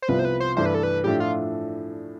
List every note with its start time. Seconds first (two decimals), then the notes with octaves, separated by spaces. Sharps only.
0.02 C5
0.08 C2 C3 F3 B3 F4 B4
0.19 C5
0.25 B4
0.40 C5
0.57 G2 E3 A3 C5
0.66 B4
0.75 A4
0.83 B4
1.04 A2 F3 A3 D4 G4
1.20 F4